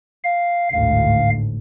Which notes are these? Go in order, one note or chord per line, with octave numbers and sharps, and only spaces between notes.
F5
G#1 D2 A2 F5